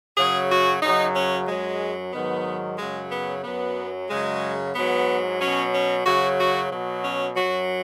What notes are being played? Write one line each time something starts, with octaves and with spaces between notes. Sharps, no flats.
F#2 C#3 F#3 G#4
F#4
F#2 C#3 F#3 D#4
C#4
F#2 F#3 G#3
G#2 D#3 F#3 B3
F#2 C#3 F#3 G#3
B3
F#2 F#3 B3
F#2 C#3 F#3 G#3
G#2 F#3 B3
B2 F#3 C#4
C#4
F#2 C#3 F#3 F#4
F#4
B2 F#3
C#4
F#2 F#3 F#4